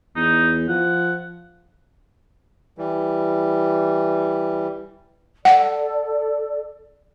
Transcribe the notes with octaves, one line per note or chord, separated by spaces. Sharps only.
E2 D#4
F3 F#5
E3 G3
A4 D5 F#5